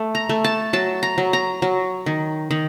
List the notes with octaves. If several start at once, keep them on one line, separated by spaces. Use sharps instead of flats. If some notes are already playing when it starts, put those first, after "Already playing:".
Already playing: A3
A#5
A3
A5
F#3 A5
A#5
F#3
A#5
F#3
D#3
D#3